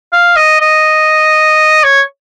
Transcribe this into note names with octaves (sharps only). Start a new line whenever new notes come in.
F5
D#5
D#5
C#5